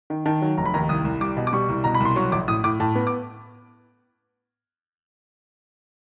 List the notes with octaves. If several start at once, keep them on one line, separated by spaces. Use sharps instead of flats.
D#3
D#3 A5
F#3
F1 A#5
B5
D#2 A#5
C2 D#6
C2
G3 D6
B2
D6
G3 C#6
C2
B2 A#5
B5
C2
C6
F#3 C#6
A#1 D6
A2 D#6
A2 D6
A2 A5
B3
D6